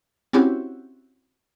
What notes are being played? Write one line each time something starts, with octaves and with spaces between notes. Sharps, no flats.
C4 C#4 E4 F#4 G4